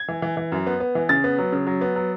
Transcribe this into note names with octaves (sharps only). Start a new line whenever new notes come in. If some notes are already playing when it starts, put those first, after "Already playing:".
Already playing: G#6
E3
E3
E3
F#2
B3
B3
E3
C#3 A6
B3
F#3
C#3
F#3
B3
F#3